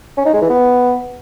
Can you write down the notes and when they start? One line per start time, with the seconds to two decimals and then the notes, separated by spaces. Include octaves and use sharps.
0.18 C#4
0.26 D#4
0.34 G#3
0.42 E3
0.50 B3